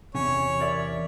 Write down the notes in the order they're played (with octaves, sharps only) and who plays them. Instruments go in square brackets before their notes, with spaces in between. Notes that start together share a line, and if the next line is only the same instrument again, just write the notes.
[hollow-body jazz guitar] E2 C3 [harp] C#4 [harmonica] C#5
[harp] A#4 D5 E5